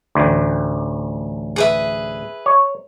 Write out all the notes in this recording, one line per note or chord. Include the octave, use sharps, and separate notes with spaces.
A1 D2
G#4 B4 E5
C#5